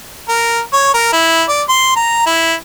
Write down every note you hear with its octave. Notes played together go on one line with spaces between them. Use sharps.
A#4
C#5
A#4
E4
D5
C6
A#5
E4